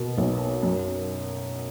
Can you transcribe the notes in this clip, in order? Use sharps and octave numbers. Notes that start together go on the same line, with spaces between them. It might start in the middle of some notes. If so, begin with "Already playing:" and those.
Already playing: B2 A#4
B1
F#2